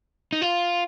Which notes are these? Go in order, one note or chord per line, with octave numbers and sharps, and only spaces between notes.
D#4
F4